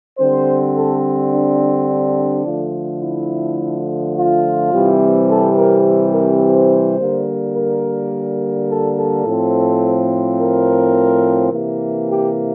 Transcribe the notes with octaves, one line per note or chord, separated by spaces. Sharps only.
D3 G3 C4 C5
A4
D4
D4
D3 F3 A3
E4
F4
C3 E3 G3 C4
A4
A#4
A#4
C5
D3 G3 A#3
A#4
A4
A4
A2 F3 C4
A#4
C3 E3 A#3
G4